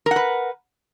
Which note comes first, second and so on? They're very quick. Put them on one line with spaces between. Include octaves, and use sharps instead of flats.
A#4 F#5 B4